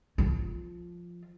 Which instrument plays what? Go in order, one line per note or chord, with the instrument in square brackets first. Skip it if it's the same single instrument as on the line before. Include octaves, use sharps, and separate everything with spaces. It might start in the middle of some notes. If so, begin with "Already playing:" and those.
[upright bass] F3 F4